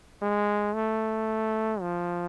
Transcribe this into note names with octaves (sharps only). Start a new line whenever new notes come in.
G#3
A3
F3